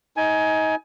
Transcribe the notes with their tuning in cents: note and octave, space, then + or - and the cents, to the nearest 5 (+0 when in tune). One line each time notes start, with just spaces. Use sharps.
D#4 +25 G#5 +15